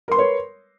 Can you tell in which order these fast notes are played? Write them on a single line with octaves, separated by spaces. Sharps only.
A#4 C6 B4 C#5